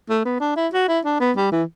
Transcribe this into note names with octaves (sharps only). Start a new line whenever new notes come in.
A3
B3
D4
E4
F#4
E4
D4
B3
G3
E3